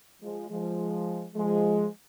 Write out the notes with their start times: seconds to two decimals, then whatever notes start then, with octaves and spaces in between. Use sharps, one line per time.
0.21 F3 G#3
0.49 F3 G#3
1.35 F3 G#3